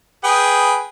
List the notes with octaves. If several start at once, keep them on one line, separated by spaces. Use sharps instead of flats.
G#4 B4 G5